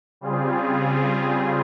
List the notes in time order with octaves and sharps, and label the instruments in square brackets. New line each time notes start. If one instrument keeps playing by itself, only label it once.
[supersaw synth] C#3 G3 C4 F4 G#4